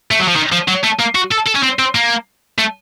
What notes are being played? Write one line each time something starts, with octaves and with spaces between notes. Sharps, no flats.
A3
F#3
F3
D#3
F3
F#3
A3
A#3
F#4
A4
A4
C#4
C4
C4
A#3
A3